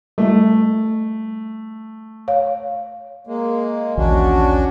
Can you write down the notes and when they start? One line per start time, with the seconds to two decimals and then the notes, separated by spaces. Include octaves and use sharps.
0.18 G3 A3 E5
2.28 C#5 F5
3.27 G#3 A#3
3.97 A#1 D#2 E3 C#4 D4 F#4